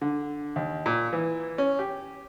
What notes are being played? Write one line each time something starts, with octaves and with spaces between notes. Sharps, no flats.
D3
D#2
A#2
E3
C#4
G4